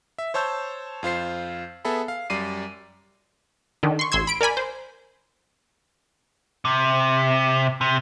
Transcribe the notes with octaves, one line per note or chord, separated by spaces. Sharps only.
E5
C5 C#5 A5 E6 G6
F2 F4 C5 C7
B3 G#4 A4 E5 B5
F5
F#2 G3 D5 D6 C7 D#7
D3 D#3
C6 C#6
A1 C6 E6 G#6
B5 D7
A#4 D5 G#5 B5
C5
C3
C3